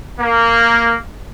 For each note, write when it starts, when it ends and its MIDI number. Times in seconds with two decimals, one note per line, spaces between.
0.18 0.95 58